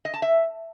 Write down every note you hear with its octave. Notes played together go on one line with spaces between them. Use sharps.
D#5
A5
E5